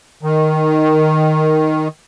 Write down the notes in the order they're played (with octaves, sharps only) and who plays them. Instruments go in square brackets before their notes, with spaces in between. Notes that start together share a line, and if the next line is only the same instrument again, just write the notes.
[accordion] D#3